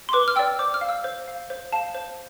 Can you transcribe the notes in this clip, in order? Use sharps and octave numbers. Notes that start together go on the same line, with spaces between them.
C6
B4 D6
F6
D5 G5 E6
C5 D6
F6
F5
E6
C5
F5
C5
F5 A5
C5